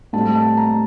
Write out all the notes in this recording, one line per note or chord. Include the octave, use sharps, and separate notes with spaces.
A2 G3 C4 A5
A5
A#5